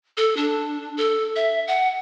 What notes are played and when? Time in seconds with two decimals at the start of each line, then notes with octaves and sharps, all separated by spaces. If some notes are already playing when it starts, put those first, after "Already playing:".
0.17 A4
0.37 D4
0.97 A4
1.36 E5
1.67 F#5